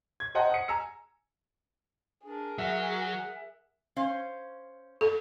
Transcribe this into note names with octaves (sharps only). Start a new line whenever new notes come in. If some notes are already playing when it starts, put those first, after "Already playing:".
G#6
C5 D#5 F#5 G5 A5 A#5
F#5 D#6 C#7
G#5 A#5 E6 C#7
D4 G#4 A#4
F#3 E5 F#5
C#4 C5 F5
A4